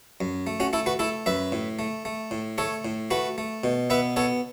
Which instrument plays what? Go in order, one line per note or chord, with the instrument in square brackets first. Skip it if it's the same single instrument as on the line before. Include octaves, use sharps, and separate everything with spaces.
[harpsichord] F#2
A3
C#4 F#4
A3 E4 A4
F#4 B4
A3 E4 A4
F#2 B4 E5
A2
A3
A3
A2
A3 A4 C#5
A2
A3 F#4 B4
A3
B2
B3 B4 E5
B3 A4 C#5